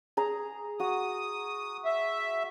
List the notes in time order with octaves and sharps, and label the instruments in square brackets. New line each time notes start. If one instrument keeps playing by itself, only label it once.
[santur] G#4 A#5
[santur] F#4 [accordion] D#6
[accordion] E5